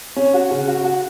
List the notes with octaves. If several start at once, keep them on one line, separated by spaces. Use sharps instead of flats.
C#4
F#4
C#3
F#4
F#4